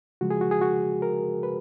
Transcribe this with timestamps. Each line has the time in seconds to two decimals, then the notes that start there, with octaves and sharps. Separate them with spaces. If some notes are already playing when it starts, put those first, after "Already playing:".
0.21 C#3 F3 G#3 F#4
0.30 G#4
0.41 F#4
0.51 G#4
0.61 F#4
1.02 A#4
1.43 B4